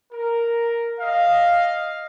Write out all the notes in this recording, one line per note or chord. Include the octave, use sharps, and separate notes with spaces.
A#4
D#5 F5